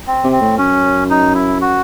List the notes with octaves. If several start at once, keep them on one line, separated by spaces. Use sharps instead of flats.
C4
C3
C4
A2
F#2 C#4
D#4
E4
F#4